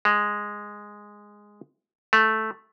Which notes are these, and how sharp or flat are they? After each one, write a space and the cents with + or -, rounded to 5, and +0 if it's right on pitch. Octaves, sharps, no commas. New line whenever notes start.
G#3 -5
A3 -5